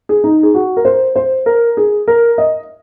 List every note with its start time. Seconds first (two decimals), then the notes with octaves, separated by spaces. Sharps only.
0.09 G#4
0.24 D#4
0.43 G#4
0.54 F#4
0.77 A#4
0.85 C5
1.16 C5
1.46 A#4
1.77 G#4
2.08 A#4
2.38 D#5